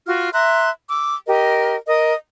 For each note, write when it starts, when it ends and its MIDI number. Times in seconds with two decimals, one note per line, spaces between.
0.06 0.30 65
0.06 0.30 66
0.06 0.30 89
0.33 0.69 76
0.33 0.69 82
0.33 0.69 84
0.33 0.69 90
0.88 1.15 86
0.88 1.15 88
1.27 1.75 67
1.27 1.75 70
1.27 1.75 75
1.86 2.13 70
1.86 2.13 75
1.86 2.13 87